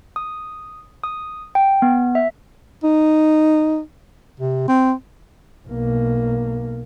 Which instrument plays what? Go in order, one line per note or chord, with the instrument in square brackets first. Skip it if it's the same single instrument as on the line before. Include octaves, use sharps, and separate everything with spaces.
[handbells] D#6
D#6
G5
B3
E5
[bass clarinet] D#4
C3
C4
[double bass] B1 A#3